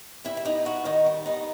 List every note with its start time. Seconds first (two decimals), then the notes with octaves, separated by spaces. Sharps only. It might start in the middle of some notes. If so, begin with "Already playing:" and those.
0.24 G3 E4 E5
0.37 E5
0.45 B3 D#4 D#5
0.65 D#4 F#4 F#5
0.85 D#3 D#4 D#5
1.06 G3
1.26 B3 D#4 D#5